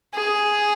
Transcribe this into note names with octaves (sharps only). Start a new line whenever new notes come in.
G#4